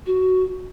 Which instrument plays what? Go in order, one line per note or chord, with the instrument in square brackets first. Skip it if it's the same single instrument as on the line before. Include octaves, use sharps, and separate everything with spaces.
[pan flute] F#4